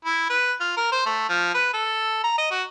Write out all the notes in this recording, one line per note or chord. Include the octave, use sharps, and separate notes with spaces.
E4
B4
F4
A#4
C5
A3
F3
B4
A4
A#5
D#5
F#4